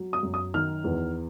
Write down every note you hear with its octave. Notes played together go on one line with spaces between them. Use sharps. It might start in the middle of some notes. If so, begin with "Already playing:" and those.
Already playing: F#3
D#6
F#2
D#6
D#3 F6
E2